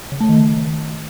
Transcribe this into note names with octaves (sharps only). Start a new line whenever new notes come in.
C#3
A3
D#3